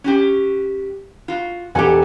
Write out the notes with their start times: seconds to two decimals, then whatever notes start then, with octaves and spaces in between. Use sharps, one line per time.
0.04 C#4 F#4 G4
1.28 F4 F#4
1.75 E1 G4 A4 F#5 G#5